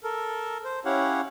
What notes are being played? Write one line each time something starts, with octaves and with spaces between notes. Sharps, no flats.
A4 A#4
C5
C#4 E4 G4 C#5 F5 F#5